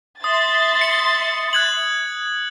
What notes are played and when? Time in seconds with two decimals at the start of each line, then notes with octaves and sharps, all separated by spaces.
0.24 E5 C6 D#6 A6
0.81 C#7
1.53 F#6 G#6 F#7